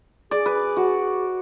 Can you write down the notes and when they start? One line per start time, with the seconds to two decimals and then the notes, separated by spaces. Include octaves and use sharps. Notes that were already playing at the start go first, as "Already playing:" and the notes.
0.31 G#4 D5
0.46 B4
0.77 F#4